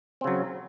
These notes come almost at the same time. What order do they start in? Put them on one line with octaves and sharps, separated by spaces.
C4 C#3 F#3